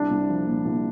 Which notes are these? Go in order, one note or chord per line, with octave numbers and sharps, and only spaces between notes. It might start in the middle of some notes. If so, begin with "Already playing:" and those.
Already playing: C2 D4
C2
F3
A#2
C2